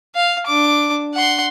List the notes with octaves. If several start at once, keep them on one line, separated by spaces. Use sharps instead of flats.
F5
D4 D6
F#5 C6